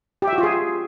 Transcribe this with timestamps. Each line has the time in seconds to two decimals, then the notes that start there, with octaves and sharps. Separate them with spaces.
0.22 G4
0.27 E5
0.33 F#4
0.38 F4
0.43 G#4